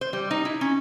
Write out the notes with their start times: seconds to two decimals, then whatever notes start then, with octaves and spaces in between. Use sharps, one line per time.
0.01 C5
0.13 G3
0.31 D#4
0.45 E4
0.61 C#4